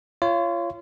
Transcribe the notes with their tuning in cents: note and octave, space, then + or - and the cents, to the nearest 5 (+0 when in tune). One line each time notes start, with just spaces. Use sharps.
F4 -30 C#5 +0